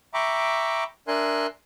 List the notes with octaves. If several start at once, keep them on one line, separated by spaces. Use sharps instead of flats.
E5 G5 A#5 B5 C#6 D6
D4 A#4 E5 G#5 C6 F#6